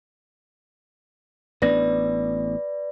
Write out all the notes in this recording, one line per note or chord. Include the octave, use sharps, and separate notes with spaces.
A1 B3 D4 B4 D5 A#6